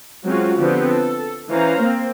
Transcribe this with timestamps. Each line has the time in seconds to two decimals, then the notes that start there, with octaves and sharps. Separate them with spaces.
0.25 F#3 G#3 C4 C#4 F4 F#4
0.58 D3 F3 B3 C4 G4
0.90 A4
1.50 E3 C#4 C5 F5 A#5
1.81 A#3 C4